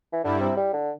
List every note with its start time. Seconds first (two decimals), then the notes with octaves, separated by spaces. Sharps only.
0.13 E3
0.24 G2 D3 G3 E4
0.40 C3
0.57 G3
0.74 D3